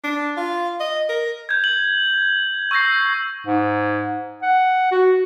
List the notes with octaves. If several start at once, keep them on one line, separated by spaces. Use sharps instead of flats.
D4
F4
D#5
A#4
G6 G#6
F#7
C#6 E6 G6 A#6 C7
G#2
F#5
F#4